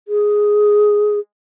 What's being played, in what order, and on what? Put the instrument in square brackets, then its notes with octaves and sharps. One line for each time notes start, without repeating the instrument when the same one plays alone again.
[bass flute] G#4